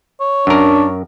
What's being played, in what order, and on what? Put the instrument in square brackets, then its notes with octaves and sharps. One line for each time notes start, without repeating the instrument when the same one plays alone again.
[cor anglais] C#5
[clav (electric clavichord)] F#2 A#4 [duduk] D4